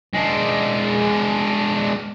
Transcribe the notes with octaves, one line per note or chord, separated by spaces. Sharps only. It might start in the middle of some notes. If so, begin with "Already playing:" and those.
G#3 D4